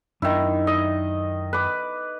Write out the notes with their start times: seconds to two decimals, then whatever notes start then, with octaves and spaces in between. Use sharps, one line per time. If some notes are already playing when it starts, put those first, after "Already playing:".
0.22 F#2 D#3 D4 E4
0.67 D#5
1.53 B4 D6